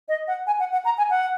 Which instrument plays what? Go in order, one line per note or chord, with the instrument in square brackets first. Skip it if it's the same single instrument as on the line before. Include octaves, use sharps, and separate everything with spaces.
[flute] D#5
F#5
G#5
F#5
F#5
A#5
G#5
F#5